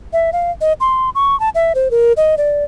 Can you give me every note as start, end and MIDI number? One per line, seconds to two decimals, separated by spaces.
0.13 0.30 76
0.33 0.51 77
0.61 0.73 75
0.80 1.10 84
1.15 1.38 85
1.40 1.49 81
1.55 1.73 76
1.75 1.91 72
1.91 2.13 70
2.17 2.35 75
2.38 2.64 74